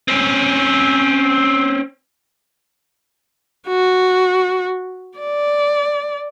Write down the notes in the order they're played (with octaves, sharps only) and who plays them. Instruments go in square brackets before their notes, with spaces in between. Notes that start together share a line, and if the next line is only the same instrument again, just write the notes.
[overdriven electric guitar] C4 C#4
[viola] F#4
D5